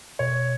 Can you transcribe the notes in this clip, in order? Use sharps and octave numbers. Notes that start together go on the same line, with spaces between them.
B2 C#5